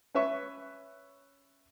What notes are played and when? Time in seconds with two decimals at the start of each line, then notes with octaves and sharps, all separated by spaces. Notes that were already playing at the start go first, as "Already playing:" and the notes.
0.15 C#4 B4 E5 C#6